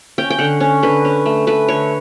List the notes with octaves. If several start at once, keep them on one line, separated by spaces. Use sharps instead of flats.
C#4 G5
G5
D3 F#5
C#4
D3 B4
C#4
A3
A3 B4
D3 C#5